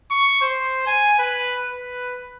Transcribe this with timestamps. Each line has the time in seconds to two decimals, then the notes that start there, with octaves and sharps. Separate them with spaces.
0.11 C#6
0.42 C5
0.87 G#5
1.19 B4
1.71 B4